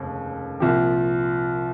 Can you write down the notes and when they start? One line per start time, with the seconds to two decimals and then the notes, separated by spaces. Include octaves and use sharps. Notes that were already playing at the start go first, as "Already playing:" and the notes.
Already playing: F1 D#2 C#3
0.60 C2 A#2 F3 G4